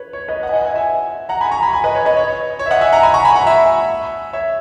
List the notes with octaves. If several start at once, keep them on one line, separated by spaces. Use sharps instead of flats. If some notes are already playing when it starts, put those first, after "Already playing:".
Already playing: B4 C#5
C#5
B4 D#5
D#5 F#5
G#5
D#5 F#5
E5 G#5
E5 G#5
F#5 A#5
G#5 B5
A#5 C#6
G#5 B5
G#5 B5
B4 D#5
C#5
B4 D#5
C#5
C#5
E5
D#5 F#5
E5 G#5
F#5 A#5
G#5 B5
A#5 C#6
G#5 B5
F#5 A#5
E5 G#5
C#5 E5